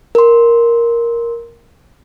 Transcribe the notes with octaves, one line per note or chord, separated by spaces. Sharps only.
A#4 C6